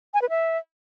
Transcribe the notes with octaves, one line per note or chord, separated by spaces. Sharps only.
G#5
B4
E5